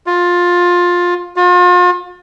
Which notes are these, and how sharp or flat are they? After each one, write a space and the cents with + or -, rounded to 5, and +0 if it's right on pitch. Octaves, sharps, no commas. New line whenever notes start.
F4 +15
F4 +40